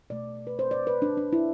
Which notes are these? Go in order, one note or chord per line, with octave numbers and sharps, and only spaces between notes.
B2 A3 D5
B4
C5
D5
B4
D4
D4
E4